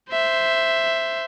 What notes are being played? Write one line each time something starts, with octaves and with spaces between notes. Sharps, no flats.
C5 E5